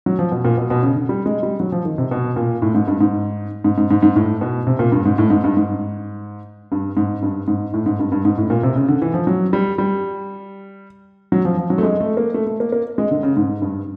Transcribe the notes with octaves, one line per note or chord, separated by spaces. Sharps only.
F#3
F3
B2
A#2
B2
B2
C#3
D3
G3
G#3
G3
F#3
F3
D#3
C3
B2
A#2
A2
G#2
G2
G#2
G#2
G#2
G#2
G#2
A2
B2
C3
A#2
G2
G#2
A2
G#2
G2
G#2
G2
G#2
G2
G#2
A2
G#2
G2
G2
G#2
A2
A#2
C3
C#3
D3
E3
F3
F#3
G3
G3
F#3
F3
F3
F#3
A3
G#3
A3
A#3
A3
A3
A#3
A#3
G#3
D3
C#3
G#2
G2